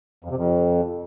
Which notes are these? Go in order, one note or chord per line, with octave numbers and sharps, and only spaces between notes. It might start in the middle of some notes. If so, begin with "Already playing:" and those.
F2
C3
F2